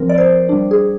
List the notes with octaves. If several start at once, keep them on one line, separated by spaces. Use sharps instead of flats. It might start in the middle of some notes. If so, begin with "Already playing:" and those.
Already playing: F3 C4 A#4
D5
C5
G3 D4
G#4